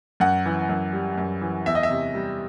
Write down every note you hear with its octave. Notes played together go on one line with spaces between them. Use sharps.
F#2 F#5
E3
F#2
G3
F#2
E3
E2 E5
D#5
E5
C3
G3